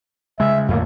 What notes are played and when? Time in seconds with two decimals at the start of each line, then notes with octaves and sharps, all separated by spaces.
0.40 C#3 G#3 E5
0.68 F2 A2 D3 A#3